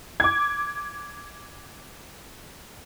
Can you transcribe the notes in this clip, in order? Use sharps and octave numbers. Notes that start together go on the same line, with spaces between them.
D6 G#6